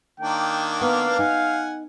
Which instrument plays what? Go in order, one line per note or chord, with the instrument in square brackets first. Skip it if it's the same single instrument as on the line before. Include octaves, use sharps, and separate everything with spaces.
[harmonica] D#3 A#3 D4 [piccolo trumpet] G5
[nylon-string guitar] B3 [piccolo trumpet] F5
[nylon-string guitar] D#4 [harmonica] F#5 G#5